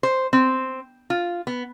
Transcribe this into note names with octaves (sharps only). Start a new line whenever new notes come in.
C5
C4
F4
B3